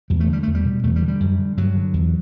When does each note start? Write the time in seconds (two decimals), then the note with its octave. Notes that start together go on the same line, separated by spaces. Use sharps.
0.10 E2 G3
0.20 A3
0.28 D3 G3
0.43 E2 A3
0.55 G3
0.64 B2
0.83 E2 A3
0.96 G3
1.02 D3
1.08 G3
1.20 F#2
1.38 D3
1.57 G2 F#3
1.75 D3
1.93 E2